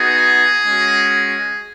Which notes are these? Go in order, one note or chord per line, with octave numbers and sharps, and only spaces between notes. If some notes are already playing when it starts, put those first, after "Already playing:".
Already playing: B3 D#4 F#4 G#4
G#3 C#4 F#4